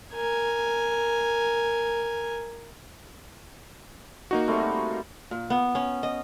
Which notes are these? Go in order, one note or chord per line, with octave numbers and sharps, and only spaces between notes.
A#4 G#5
A#3 D#4 F#4
G3 A3 C4
A#2
B3
C#4
D#5